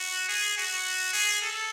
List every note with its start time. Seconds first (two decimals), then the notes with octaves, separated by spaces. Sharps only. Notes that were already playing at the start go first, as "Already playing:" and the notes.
Already playing: F#4
0.29 G#4
0.57 F#4
1.13 G#4
1.42 A4